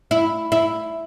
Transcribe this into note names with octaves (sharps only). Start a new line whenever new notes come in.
E4
E4